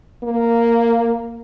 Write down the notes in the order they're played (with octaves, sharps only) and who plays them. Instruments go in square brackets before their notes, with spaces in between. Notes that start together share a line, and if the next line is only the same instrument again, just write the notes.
[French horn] A#3